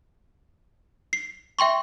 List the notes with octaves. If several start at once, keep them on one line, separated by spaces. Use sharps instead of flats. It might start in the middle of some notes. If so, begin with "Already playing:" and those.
C7
E5 G5 C6 C#6